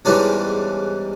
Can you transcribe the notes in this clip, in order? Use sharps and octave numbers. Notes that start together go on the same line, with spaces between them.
E2 G#2 E3 G3 C#4 D4